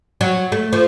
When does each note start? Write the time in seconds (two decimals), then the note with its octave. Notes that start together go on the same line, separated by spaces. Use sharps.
0.21 F#3
0.52 A3
0.73 F3